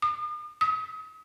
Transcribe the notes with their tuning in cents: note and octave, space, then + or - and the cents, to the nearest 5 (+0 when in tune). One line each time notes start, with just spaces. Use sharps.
D#6 -45
D#6 +40